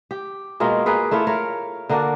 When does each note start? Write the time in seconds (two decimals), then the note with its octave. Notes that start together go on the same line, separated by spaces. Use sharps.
0.11 G4
0.60 B2 G#3 A#3 F4
0.86 A#3 G#4 B4
1.11 A3 E4 F4 C#5
1.27 A#4 C#5 F5
1.89 D3 A#3 D4 F#4